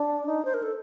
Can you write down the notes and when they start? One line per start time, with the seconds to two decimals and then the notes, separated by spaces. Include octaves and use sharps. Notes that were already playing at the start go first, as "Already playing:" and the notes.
Already playing: D4
0.26 D#4
0.45 C5
0.54 A#4
0.63 A4